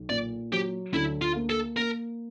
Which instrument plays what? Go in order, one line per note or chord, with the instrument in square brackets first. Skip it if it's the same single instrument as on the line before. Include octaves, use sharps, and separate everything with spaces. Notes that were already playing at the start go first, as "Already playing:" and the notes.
Already playing: [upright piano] B1
[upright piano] A#2 [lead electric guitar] D5
[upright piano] F#3 [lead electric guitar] G4
[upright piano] D2 [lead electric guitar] E4
[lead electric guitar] F4
[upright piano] A#3
[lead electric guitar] A4
[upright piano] A#3 [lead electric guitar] A#4